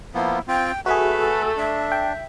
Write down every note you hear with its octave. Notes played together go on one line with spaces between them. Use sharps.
F3 A#3 B3 E4
C4 F4 G5
A3 F#4 G#4 B4 E5
A4
D4 E5
G5